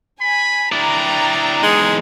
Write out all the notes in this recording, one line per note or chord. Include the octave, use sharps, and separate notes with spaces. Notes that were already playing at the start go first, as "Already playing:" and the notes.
G#5 B5
D4 E4 D5 G5 A#5
E2 G#3 D#4